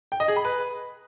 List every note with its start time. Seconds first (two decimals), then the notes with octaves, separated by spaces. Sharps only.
0.12 G5
0.20 D#5
0.28 G#4
0.36 B5
0.45 B4